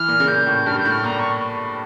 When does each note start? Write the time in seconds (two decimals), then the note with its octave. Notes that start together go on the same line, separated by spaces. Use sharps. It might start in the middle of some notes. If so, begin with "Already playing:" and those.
Already playing: E3 F6
0.08 A#2
0.20 C#3
0.27 A#2 G6
0.47 A2
0.66 G2 F6
0.78 G6
0.85 A2
0.90 F6
1.04 A#2 A#5
1.19 C#6